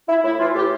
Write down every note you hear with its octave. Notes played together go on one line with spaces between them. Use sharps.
E4
A2 E4
E3 F4
A2 G4